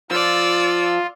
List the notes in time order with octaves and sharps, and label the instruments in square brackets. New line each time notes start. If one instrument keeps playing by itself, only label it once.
[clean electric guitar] F3 [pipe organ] F4 [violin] D5 E6